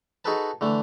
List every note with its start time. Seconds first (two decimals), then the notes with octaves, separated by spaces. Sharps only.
0.25 D#4 F#4 G#4 A4 B4 A5
0.61 D3 E3 A3